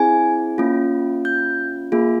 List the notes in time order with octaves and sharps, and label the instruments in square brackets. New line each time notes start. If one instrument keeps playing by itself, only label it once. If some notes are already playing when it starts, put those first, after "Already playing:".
Already playing: [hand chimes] C4 E4 G#4 G#5
A#3 C#4 F4
G6
A#3 F4 G#4